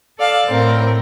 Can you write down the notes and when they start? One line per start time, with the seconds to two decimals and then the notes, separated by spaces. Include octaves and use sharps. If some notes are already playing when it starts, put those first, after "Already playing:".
0.18 A4 D5 F5 A5
0.47 A2 C4 A#4